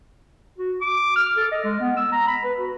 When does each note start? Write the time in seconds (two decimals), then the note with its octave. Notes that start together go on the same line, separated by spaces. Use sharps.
0.58 F#4
0.81 D6
1.16 F6
1.37 A4
1.51 D#5
1.64 G#3
1.80 B3
1.97 E6
2.12 A#5
2.27 B5
2.44 B4
2.58 F#4